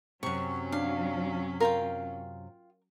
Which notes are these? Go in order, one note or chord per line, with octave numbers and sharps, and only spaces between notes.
F#2 C3 F#3 C#4 C#6
D4 F5
F4 A#4 F5 G5